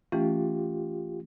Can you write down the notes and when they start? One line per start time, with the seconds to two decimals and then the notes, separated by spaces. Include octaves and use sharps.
0.12 E3 A3 C#4 F4 G4